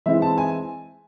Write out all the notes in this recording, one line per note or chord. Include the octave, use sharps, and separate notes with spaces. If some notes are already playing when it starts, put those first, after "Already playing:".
E3 G#3 C4 E4 E5
A5
G#5